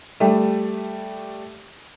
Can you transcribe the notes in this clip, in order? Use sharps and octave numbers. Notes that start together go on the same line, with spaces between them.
G3 A3